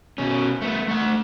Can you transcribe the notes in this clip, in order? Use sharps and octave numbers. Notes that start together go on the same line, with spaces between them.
B2 C#4
A3 B3
A3 F#5